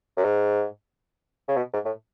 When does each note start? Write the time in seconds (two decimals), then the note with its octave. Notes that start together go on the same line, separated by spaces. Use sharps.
0.17 F#2
0.24 G#2
1.48 C#3
1.57 B2
1.74 G#2
1.85 A2